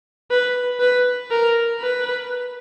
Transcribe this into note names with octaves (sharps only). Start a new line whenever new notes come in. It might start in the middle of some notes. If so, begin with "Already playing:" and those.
B4
B4
A#4
B4